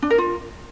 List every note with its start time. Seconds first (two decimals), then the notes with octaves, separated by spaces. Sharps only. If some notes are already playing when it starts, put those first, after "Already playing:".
0.02 D4
0.10 A#4
0.18 F4